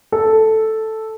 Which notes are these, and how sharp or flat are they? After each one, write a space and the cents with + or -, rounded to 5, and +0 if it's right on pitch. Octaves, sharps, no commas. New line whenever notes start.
A4 +0